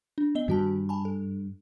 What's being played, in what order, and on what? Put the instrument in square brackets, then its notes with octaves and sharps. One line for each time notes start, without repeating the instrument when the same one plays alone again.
[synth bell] D4
B3 D#5 G7
[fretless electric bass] G2 [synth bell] D#3 F#4 A5
[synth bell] G#5 A5 B5
A4